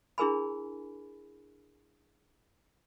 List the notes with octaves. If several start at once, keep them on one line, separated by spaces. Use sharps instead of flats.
D4 E4 G#4 A#4 G#5 B5